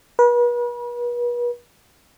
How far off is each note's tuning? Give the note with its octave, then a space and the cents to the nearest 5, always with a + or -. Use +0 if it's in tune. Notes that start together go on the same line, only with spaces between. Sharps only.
B4 -40